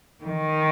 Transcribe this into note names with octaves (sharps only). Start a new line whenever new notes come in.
D#3